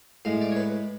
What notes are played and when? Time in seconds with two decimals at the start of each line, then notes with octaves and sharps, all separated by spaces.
0.25 A2 G#3 F5
0.41 D5
0.52 C#5
0.56 B4